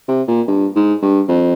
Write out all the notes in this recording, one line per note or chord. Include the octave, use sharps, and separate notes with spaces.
C3
A#2
G2
G#2
G2
F2